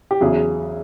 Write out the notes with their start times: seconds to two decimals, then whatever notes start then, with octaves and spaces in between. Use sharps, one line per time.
0.11 G4
0.21 E2 C#3 F#3 G#4